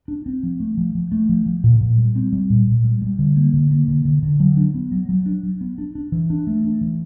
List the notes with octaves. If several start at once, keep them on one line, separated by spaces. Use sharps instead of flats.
D4
C4
F3
A3
F3
F3
A3
F3
F3
A#2
A#2
G3
C4
G3
A#2
A#2
G3
G3
D3
A#3
D3
A#3
D3
D3
D3
F#3
D4
B3
F#3
F#3
D4
F#3
B3
D4
D4
E3
D4
A3
D4
E3